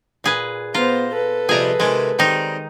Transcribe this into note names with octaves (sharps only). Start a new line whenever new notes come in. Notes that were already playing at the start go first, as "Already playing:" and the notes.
A#2 G#4 B4
B3 F4 C5 A#5
A4 B4
F2 C3 G3 G#4 A#5
C3 D#3 G#3 C#4
D#3 G3 C4 D#4 A#5